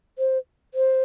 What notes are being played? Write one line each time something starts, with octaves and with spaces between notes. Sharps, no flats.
C5
C5